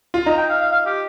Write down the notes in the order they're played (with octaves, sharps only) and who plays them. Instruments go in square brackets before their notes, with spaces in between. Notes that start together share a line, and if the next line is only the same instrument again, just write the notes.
[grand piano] F4
[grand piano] D#4 [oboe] A#5
[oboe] G5
F5
F5
F5
G4